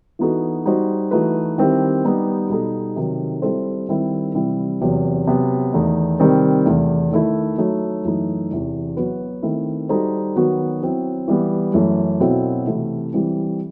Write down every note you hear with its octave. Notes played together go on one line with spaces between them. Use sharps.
E3 B3 D#4 F#4 A4
G3 D#4 F#4 C5
E3 A3 D#4 F#4 B4
D#3 G3 C4 E4 G4
G3 B3 D#4 G4
B2 G3 D#4 A4
C3 D#3 F#3
G3 C4 E4 A4 C5
D#3 G3 C4 E4
C3 E3 G3 C4 E4
E2 C3 F#3 B3
C3 F#3 B3 F#4
E2 D#3 A3 D#4
C3 D#3 G3 C4
E2 C3 E3 A3
D#3 A3 E4
F#3 A3 D#4
F#2 E3 A3 D#4
E2 C3 E3
F#3 B3 F#4 B4
D#3 A3 C4 E4
G3 D#4 F#4 A4 C5
D#3 F#3 B3 F#4
F#3 C4 E4
E3 G3 B3
F#2 E3 A3
B2 F#3 C4 E4 A4
C3 E3 A3 E4
E3 G3 C4 E4